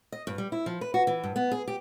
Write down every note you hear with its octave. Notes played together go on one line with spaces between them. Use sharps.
D#5
G2
G3
E4
F3
B4
F#4
E3
G2
B3
G#4
G4